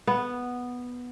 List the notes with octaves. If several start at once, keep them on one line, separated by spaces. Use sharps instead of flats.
B3